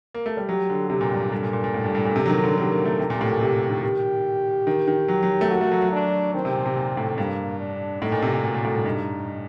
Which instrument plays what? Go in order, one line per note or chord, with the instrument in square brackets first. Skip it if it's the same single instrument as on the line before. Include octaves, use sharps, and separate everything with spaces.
[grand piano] A#3
A3
G3
[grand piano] F#3 [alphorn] G4
[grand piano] D3
[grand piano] C3 [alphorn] G4
[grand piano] A#2
G2
[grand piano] G2 [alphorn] A4
[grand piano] A#2
A#2
A#2
A2
G2
G2
A#2
C3
F#3
D#3
D3
[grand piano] D#3 [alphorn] G4
[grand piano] A#3
A3
[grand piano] C3 [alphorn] G4
[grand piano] A#2
A2
A#2
[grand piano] C3 [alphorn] G4
[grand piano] D#3
[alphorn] G4
[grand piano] D#3
D#3
F#3
F#3
A3
[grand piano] A#3 [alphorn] F#4
[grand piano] A3
F#3
F#3
[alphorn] D4
[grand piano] D#3 [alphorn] C4
[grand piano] C3
A#2
C3
A#2
A2
[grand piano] G2 [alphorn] A#3
[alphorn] D4
[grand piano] A2 [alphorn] D#4
[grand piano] A#2
C3
A#2
[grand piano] A#2 [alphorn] F#4
[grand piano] A#2
A2
G2
[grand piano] G2 [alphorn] D#4